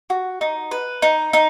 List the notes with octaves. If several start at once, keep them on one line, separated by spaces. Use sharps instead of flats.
F#4
D#4
B4
D#4
D#4